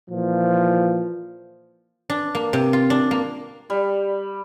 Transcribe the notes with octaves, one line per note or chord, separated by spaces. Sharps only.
A#2 E3 F3
D4
A#3
C3
F4
D4
A#3
G3